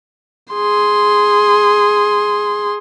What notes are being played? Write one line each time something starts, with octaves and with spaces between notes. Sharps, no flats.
G#4 C6